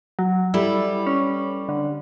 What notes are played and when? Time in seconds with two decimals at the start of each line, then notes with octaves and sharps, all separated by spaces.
0.19 F#3
0.54 G3 E4 A4 B4
1.07 C#4
1.69 D3